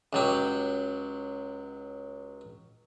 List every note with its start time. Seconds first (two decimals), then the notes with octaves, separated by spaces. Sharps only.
0.13 C#2 F#3 G4